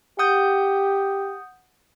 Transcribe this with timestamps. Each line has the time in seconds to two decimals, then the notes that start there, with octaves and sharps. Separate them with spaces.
0.19 G4 F#5 D#6 G6